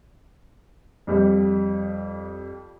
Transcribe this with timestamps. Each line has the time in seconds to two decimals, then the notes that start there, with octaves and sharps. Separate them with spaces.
1.07 F2 G3